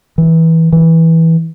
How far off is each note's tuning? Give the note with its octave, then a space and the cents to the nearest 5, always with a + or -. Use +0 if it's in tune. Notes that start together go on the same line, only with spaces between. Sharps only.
E3 -20
E3 -15